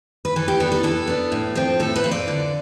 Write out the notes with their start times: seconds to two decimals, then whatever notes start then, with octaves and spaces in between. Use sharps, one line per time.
0.25 B4
0.36 E3 A4
0.48 G4
0.60 B3 D4 A4
0.72 A4
0.83 E3 A4
1.07 B3 D4
1.32 A2
1.55 F3 C4
1.80 A2 A4
1.96 B4
2.04 F3 C4
2.11 D5
2.28 D3